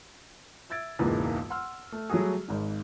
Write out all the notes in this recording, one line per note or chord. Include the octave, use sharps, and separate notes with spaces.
E5 E6 G#6 A6 D7
E1 C#2 G#2 E3 A#3 B4
F#5 C6 E6 F6
A3
F#3 G3 A3 F#4 G#4
G#1 G#2